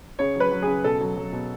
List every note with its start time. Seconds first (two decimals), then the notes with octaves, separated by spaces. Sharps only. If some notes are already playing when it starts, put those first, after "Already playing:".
0.19 C#3 C#5
0.36 F#3 B4
0.51 F#3
0.62 C#3 G#4
0.84 B2 A4
1.01 F#3
1.17 F#3
1.32 B2